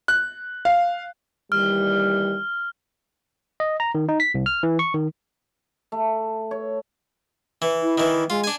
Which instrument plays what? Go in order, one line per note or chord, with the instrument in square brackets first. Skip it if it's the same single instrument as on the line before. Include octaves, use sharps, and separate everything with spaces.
[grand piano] F#6
F5
[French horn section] D#2 E3 G3 [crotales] F6
[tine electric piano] D#5
A#5
D#3
D#4
B6
C2
F6
E3
C#6
D#3
[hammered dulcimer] A3
C#5
[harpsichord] E3
[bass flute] E4
[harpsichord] D#3 E3
[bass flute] G#3 [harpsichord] F4
[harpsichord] D4 G#5